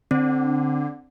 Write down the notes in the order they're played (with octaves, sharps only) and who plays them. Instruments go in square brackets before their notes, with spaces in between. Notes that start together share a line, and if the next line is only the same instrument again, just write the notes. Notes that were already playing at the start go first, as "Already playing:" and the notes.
[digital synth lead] D3 [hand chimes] C4